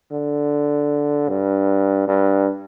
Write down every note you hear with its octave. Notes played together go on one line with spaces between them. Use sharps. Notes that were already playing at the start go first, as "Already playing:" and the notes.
D3
G2
G2